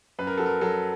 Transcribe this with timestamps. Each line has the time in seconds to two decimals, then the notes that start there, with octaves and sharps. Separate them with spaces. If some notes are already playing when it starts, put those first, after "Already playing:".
0.19 F#2 B4
0.27 A#4
0.37 F#3 A4
0.46 A#4
0.61 F#3 A4